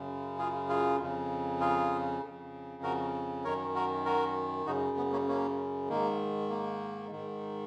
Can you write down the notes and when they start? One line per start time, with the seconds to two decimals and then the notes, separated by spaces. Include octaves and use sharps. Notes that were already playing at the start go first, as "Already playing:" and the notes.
Already playing: F#2 C#3
0.38 F4 G#4
0.69 F4 G#4
1.00 F2 C#3
1.60 F4 G#4
2.22 F2 C#3
2.83 F#4 A#4
3.44 F#2 D#3 A#4 C#5
3.75 F#4 A#4
4.06 F#4 A#4
4.66 F#2 C#3 D#4 F#4
4.97 B3
5.12 A#3 C#4
5.29 A#3 C#4
5.89 G#2 D#3 A#3
6.50 A#3
7.11 G#2 D#3